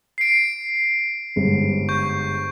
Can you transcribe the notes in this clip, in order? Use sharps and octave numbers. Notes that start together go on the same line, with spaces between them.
C7 D7
G1 G#2
C#6 G6